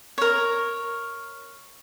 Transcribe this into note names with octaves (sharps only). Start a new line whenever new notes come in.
A#4 C#5